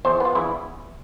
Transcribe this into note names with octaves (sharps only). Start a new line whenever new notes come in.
E2 C5
B3 F4
E2 E4